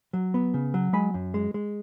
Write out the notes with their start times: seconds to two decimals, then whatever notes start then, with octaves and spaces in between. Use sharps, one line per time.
0.13 F#3
0.34 B3
0.54 C#3
0.74 F#3
0.93 G#3 G#5 B5
1.14 F#2
1.34 G#3
1.54 G#3